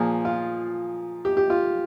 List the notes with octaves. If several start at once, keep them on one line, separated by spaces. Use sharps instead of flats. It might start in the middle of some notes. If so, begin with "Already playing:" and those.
Already playing: A#2 F3 A#3 G#4
F4
G4
G4
F4